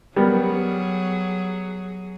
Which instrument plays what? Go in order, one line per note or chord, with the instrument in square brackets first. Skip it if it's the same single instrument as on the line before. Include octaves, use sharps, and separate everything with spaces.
[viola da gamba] F#3 G#4 [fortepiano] G3 B3 A#4